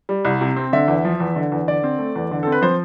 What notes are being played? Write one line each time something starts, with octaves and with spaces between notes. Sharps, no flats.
G3
C2
C3
C4
D3 E5
E2
F3
E2
D3
E2
D3 D5
C4
A3
E2
D3
C4 A4
B4
F3 C5